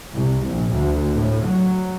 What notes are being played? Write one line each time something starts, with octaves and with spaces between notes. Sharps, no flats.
C2
A#1
D2
A2
F#3